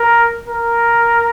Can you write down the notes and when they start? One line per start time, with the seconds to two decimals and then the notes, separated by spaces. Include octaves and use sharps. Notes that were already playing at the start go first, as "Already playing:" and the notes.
Already playing: A#4
0.48 A#4